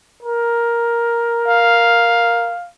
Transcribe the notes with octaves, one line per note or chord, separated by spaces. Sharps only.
A#4
F5